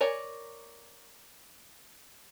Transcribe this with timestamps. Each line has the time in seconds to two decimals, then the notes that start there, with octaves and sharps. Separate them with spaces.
0.01 A#4 C#5 D5 G#5